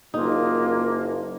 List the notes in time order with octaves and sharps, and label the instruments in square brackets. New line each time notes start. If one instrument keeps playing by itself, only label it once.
[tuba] F#1 [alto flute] A#3 [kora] D#4 [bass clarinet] F4